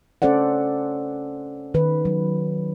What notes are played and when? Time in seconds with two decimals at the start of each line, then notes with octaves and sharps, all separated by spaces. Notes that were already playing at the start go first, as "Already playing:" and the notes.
0.22 C#4 A4 C5 D5 F#5
1.74 D#3 B4
2.05 F#3